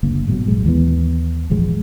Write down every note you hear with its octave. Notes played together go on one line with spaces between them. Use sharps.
F#1 D2 A#3
G#2 B2 F#3
E1 A#1 G#3
D#2 E3 G3 B3
E1 A1 F3 G#3